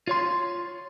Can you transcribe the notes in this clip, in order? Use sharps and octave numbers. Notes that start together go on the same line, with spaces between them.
F4 C#5 C6